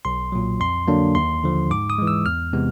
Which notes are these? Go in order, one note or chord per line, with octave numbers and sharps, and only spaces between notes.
B1 C6
A#2 F#3
F2 C6
D3 F#3 A#3 D4
D#2 C6
D3 F3
G#2 D6
D#6
E3 G#3
E6
E2 F6
C3 E3 G#3 B3